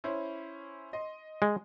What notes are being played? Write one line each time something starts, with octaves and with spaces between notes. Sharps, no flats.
C#4 E4 C5
D#5 C6
G#3